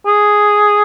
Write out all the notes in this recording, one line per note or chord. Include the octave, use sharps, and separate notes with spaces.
G#4